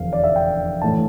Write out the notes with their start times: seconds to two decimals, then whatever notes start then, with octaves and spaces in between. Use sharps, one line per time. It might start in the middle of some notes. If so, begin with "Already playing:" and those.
Already playing: F1 E2 D3 F5
0.13 D5
0.24 E5
0.36 G5
0.81 A2 E3 A3 D4 A5